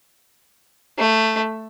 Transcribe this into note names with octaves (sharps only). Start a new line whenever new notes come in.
A3